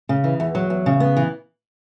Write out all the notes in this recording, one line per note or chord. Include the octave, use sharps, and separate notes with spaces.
C#3
E3
E2
F#3
E2
C#3
B3
E3